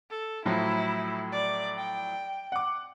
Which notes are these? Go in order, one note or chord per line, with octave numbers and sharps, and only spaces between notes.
A4
A2 F3 F#3 E4
D5
G5
F#5 D6